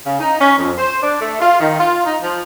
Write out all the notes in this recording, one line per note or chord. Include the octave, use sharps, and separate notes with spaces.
C#3
D#4
C#4
F2
C5
D4
A3
F4
D#3
F4
D#4
F3